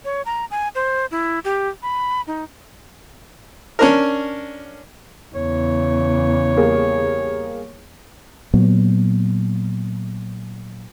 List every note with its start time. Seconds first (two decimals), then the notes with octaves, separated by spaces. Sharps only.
0.05 C#5
0.26 A#5
0.51 G#5
0.75 C5
1.11 E4
1.44 G4
1.83 B5
2.27 D#4
3.79 C#4 D4 A#4
5.35 E2 C#3 C#5
6.57 G3 A#3 G#4
8.54 A#2 F#3 B3